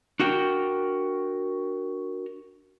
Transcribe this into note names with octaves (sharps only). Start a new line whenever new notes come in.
D4 F#4 A#4 G5